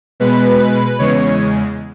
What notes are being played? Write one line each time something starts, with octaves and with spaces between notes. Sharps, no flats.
B2 G#3 B4
B4
E2 C#3 G#3 C#5